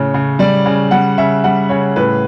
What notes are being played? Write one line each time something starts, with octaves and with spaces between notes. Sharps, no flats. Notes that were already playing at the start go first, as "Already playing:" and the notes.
Already playing: A2 C#3 C#5
C#3
G3 D5
C#3
G3 F#5
C#3 E5
G3 F#5
C#3 C#5
A2 B4